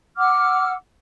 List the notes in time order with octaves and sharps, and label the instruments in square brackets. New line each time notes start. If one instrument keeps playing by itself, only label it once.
[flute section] F#5 D6 E6 F6